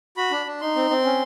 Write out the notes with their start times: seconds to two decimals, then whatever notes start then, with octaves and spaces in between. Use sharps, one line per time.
0.17 F#4 B5
0.31 D4
0.46 D4
0.61 D#4 C6
0.76 C4
0.90 C4
1.05 C#4